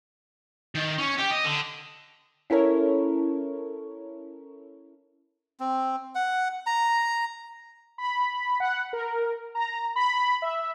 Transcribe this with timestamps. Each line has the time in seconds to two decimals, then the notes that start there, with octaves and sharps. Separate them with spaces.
0.75 D#3
0.98 C#4
1.18 G4
1.31 D#5
1.44 D3
2.50 C#4 E4 A4 A#4 C#5
5.60 C4
6.15 F#5
6.66 A#5
7.98 B5
8.60 F#5
8.93 A#4
9.55 A#5
9.96 B5
10.42 E5